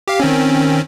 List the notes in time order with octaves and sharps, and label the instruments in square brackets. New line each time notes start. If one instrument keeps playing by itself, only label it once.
[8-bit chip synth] G4 F5
D#3 C4 C#4